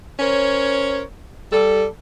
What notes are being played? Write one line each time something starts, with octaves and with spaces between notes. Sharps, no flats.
C#4 A#4 C5 C#5
G3 A4